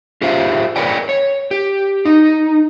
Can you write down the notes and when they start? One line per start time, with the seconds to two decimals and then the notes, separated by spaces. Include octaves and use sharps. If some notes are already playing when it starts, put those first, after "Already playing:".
0.22 F4 G4 G#4 C5 E5 F5
0.76 G#4 A#4 B4 C#5 D5 G5
1.09 C#5
1.51 G4
2.05 D#4